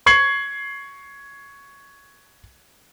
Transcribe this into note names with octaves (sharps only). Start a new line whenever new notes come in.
C#6 G#6 C7 F#7